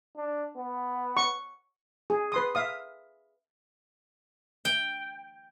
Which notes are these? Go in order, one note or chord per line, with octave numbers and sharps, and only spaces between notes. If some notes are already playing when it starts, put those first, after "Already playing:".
D4
B3
C#6
G#4
B4 C6 D#6
E5 F5 D#6
G5